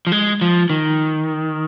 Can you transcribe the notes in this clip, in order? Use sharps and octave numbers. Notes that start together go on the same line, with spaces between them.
F3
G#3
F3
D#3